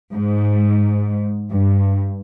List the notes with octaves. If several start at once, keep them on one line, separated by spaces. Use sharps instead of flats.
G#2
G2